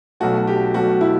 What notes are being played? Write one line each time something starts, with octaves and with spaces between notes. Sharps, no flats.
B1 B2 A3 F#4
G4
B1 B2 A3 F#4
E4